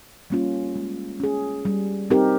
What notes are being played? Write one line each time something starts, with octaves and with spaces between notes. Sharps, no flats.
G3 A#3 C#4 F4
G#3
C#4 G#4
G3
C4 D#4 G4 A#4